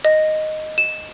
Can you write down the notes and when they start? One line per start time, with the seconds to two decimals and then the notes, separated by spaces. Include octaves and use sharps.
0.05 D#5
0.78 E7